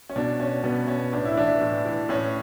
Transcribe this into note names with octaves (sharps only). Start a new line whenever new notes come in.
C#4
B2 D4
C#4
B2 B3
C#4
A2 D4
E4
E3 D4
A2
E3
A2 C#4